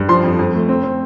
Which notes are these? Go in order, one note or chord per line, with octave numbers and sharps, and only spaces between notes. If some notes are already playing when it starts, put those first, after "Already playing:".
Already playing: G2
F3 C6
F2
F2
A3
C4
C4